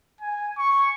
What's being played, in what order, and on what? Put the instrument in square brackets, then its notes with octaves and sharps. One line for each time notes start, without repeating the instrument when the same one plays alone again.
[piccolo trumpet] G#5
C#6